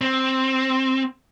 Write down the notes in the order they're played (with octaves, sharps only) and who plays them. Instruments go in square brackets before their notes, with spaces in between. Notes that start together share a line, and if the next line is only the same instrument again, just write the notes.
[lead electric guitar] C4